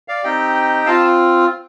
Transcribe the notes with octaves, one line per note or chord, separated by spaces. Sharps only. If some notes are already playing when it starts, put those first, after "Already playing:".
D5 F5
C4 D#4 G4 D#5 G5
C4 F4 F5 A5